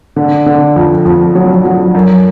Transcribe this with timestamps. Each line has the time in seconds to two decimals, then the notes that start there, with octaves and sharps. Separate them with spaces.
0.16 D3
0.46 D3
0.76 F2
1.05 F2
1.35 F#3
1.65 F#3
1.95 F#2